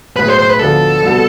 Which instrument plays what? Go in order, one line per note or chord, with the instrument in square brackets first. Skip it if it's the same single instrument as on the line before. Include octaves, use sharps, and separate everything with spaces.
[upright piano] B1 A2 G#3 [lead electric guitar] B4
[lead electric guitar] C5
C5
B4
[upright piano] D2 D3 F3 B3 [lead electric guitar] A4
[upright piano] C2 B2 B3